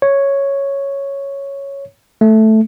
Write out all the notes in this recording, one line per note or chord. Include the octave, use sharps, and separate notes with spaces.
C#5
A3